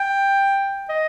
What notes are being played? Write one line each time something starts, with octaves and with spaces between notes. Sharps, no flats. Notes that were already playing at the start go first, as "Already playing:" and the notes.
Already playing: G5
D#5